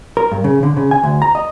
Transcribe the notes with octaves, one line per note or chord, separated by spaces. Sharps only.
A#4
G2
C#3
D3
C#3
G#5
D2
A#5
D#5